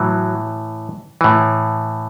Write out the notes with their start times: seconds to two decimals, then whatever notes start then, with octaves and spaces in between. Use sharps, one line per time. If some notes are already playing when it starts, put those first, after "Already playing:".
Already playing: A2 E3 F#3
1.21 A2 E3